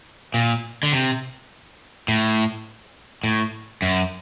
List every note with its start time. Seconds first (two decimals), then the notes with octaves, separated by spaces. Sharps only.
0.34 A#2
0.83 D3
0.92 C3
2.08 A2
3.24 A2
3.82 F#2